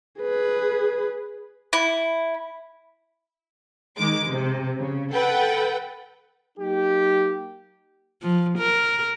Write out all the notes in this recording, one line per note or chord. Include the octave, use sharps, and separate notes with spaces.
G#4 B4
E4
D#3 G#3 D6
C3
C#3
A4 B4 F#5 G5
F#3 A#3 D#4 G4
F3
A#4